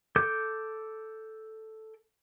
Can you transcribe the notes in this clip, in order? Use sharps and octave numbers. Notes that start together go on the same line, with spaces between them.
A4 D6 G6